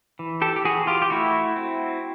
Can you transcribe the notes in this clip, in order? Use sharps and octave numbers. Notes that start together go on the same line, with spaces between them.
E3
G4 A4
G4
E3 F#4 G#4
F4 G4
G4
A3 E4 F#4
C4